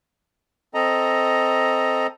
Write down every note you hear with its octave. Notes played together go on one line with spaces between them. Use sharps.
C4 A4 D#5 A#5